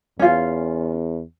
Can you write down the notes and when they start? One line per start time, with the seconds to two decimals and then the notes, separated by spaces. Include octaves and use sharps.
0.19 E2 C#4 F4